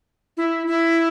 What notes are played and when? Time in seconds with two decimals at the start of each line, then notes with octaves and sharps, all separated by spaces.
0.37 E4
0.67 E4